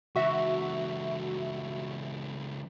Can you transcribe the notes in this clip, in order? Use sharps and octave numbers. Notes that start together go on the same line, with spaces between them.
C#2 E3 F#4 E5